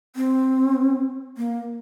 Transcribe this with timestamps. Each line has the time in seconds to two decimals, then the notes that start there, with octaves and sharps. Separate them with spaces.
0.16 C4
1.37 A#3